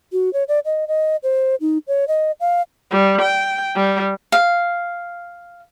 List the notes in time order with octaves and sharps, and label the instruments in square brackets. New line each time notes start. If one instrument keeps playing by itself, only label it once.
[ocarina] F#4
C#5
D5
D#5
D#5
C5
D#4
C#5
D#5
F5
[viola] G3
G5
G3
[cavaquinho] F5